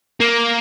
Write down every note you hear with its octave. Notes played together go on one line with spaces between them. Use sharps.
A#3